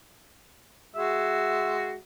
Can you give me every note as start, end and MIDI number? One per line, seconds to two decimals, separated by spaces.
0.95 1.95 56
0.95 1.95 66
0.95 1.97 76